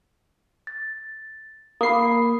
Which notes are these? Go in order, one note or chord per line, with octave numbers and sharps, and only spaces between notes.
A6
A#3 B5 D#6 C7